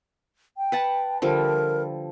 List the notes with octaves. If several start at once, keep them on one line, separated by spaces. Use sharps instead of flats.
G5
B4 F#5 A5
D3 F3 G3 A#4